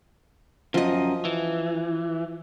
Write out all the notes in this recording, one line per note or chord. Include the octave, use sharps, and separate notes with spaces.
F#2 F3 D#5
E3